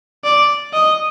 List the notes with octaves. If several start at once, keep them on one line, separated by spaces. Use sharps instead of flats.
D5
D#5